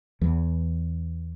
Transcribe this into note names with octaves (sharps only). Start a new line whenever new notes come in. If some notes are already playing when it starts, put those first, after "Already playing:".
E2 E3